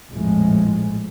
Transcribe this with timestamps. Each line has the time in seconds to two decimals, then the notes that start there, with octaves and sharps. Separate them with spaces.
0.10 A#1 F2 A2 F3 G#3